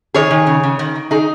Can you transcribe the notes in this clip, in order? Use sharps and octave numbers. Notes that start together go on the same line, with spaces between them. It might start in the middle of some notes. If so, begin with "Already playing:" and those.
D#3 G#4 C#5
D#3
C#3
C#3
D#3
D#3
D#3 D#4 G#4